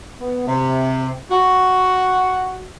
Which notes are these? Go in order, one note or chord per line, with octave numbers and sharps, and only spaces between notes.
B3
C3
F#4